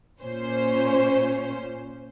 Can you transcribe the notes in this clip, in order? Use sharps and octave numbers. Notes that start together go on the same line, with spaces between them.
A#2 C#4 C5